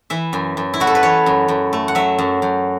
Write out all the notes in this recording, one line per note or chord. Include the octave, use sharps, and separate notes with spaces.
E3 E5
F#2
F#2
E4
A3 F#4
A4
B4
E3 C#5
F#2
F#2
A3
F#5
F#3 E5
F#2
F#2